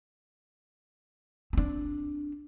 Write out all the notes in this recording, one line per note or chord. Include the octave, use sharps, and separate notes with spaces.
C4 D4